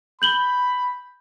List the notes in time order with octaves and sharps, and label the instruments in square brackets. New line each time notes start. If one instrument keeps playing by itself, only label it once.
[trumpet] B5 [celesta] G6 F#7 G7